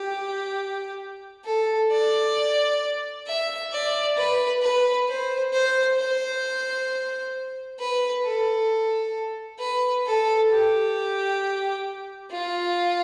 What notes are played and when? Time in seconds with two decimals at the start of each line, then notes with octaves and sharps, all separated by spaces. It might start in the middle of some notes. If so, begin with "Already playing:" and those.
Already playing: G4
1.45 A4
1.91 D5
3.27 E5
3.72 D5
4.17 B4
4.62 B4
5.08 C5
5.52 C5
5.97 C5
7.79 B4
8.24 A4
9.59 B4
10.06 A4
10.50 G4
12.31 F4